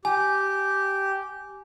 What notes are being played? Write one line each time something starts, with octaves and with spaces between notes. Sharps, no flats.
G4 G#5